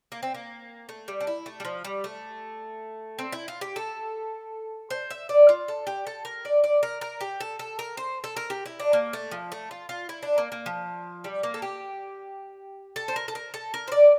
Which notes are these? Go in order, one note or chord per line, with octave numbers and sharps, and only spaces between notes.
A#3
C4
A#3
A3
G3
D4
E4
A3
G3
F3
G3
A3
C4
E4
F4
G4
A4
C5
E5
D5
F4
A4
G4
A4
A#4
D5
D5
A#4
A#4
G4
A4
A4
A#4
C5
A4
A#4
G4
E4
D4
A#3
A3
F3
A3
F4
F4
E4
D4
A#3
A#3
F3
G3
A#3
A4
G4
A4
C5
A#4
A4
A#4
A4
A#4
C5
D5